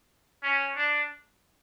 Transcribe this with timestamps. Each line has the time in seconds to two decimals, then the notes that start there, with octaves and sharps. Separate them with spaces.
0.43 C#4
0.76 D4